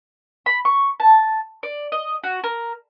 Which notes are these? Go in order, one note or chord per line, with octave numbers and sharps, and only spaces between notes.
B5
C#6
A5
D5
D#5
F#4
A#4